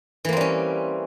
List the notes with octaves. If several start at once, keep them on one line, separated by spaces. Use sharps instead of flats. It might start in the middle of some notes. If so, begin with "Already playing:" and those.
E3 G3 A#3 C4 C#4